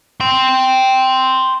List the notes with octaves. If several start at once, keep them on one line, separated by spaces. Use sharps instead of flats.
G5 C6